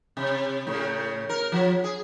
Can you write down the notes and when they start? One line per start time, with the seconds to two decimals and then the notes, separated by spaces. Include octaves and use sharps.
0.17 C3
0.67 A2 C#3
1.29 A#4
1.52 F3
1.84 G#4